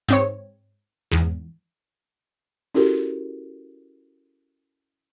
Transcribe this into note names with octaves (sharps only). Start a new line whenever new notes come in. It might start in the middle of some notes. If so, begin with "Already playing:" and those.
G#2 C4 C#5
E2 G#2
C#4 E4 F#4 G4 A4 A#4